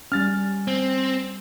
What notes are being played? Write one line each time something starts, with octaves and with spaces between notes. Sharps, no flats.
G3 C#4 F6 A6
C4